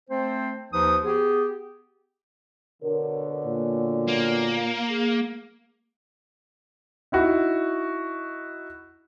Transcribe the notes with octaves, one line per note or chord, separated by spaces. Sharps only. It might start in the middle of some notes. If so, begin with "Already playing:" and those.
A3 C4 C5
D#2 F3 D#4 B4 D#6
B3 G4 G#4
B2 D3 A#4 C#5
A#2
A#3
G#4
D#4 E4 F#4